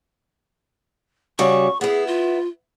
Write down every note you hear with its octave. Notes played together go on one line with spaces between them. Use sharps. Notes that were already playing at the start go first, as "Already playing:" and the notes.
C#3 G3 F#4 C#6
B3 E4 G#4
F4